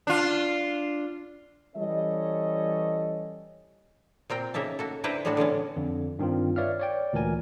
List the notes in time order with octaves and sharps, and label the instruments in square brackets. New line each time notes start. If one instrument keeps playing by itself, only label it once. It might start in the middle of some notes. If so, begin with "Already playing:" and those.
[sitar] D4 F4
[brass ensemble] E3 G3 C#4 A4 C#5 D#5
[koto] A#2 C4 A#4 G5
C#3 A#3 D#4 E5 A5
A#3 F#4 A4
D4 E4 B4 C5 G5 A#5
A2 G3 G#3 D4 F#4
D3 E3 B3 C#4
[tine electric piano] F2 D3
G2 D#3 C4 F4
B4 C#5 D5 E5 F5 F6
C#5 D5 G5
D2 A#2 E3 A#4 G#5